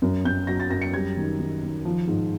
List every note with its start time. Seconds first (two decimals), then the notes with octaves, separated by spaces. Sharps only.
0.02 F#2
0.25 F#2 G6
0.47 F#3 A#6
0.60 A6
0.70 F#2 A#6
0.82 C#7
0.94 G3 G#6
1.17 D#3
1.39 D#3
1.63 D#3
1.85 F3
2.07 G#2